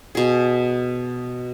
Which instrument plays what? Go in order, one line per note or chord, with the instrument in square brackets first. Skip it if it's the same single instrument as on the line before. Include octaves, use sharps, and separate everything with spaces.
[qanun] B2 G#4